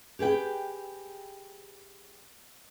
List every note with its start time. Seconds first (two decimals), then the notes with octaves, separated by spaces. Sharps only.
0.19 G4 G#4 B4 G5